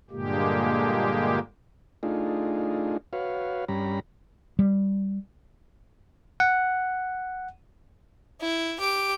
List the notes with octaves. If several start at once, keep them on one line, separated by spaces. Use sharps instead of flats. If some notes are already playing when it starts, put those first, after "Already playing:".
G2 A#2 D3 G#3 A#3 G4
A3 D4 D#4 F4 G#4
F#4 B4 C#5 F5
G2 G3 C#4 A#5 B5
G3
F#5
E4
G4 D7